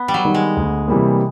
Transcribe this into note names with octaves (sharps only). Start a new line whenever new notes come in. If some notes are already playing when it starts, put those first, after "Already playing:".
Already playing: B3
G3
F#3
D#3 G3
G#3
D2
C3 E3 G3 A#3